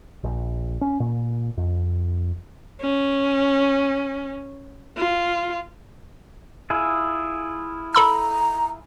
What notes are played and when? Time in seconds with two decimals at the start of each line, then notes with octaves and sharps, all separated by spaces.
0.24 A#1
0.81 C#4
1.00 A#2
1.57 F2
2.81 C#4
4.97 F4
6.70 E4 F4 G#4
7.95 A4 A#5 B5 E6